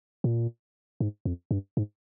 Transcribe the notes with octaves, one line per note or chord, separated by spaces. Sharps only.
A#2
G#2
F2
G2
G#2